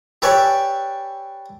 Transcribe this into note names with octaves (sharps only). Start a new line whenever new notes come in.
G4 A4 B4 C#5 D5 G#5